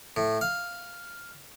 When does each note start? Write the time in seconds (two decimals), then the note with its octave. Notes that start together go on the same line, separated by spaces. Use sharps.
0.17 A2
0.41 F5